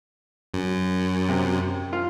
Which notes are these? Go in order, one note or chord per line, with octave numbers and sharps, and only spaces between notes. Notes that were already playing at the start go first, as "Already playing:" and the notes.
F#2
C3 F#3
F4